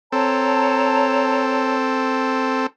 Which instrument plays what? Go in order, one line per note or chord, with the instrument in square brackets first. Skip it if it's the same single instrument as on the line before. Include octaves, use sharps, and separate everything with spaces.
[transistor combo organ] C4 A4 [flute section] C#5 A5 A#5